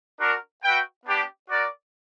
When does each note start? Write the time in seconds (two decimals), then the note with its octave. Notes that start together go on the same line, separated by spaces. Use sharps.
0.19 D4 F#4 A#4
0.63 F#4 B4 E5 G5
1.06 B3 D4 G4
1.50 F#4 A#4 D5